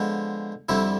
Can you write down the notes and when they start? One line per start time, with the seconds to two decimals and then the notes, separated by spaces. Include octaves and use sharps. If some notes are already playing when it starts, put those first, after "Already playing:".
Already playing: D3 F3 G#3 B3
0.69 F2 D3 G3 C4 E4